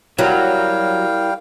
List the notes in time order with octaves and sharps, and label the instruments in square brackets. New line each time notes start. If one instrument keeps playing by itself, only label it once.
[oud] F#3 [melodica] G3 F5 G5 [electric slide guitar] E4 A#4 C#5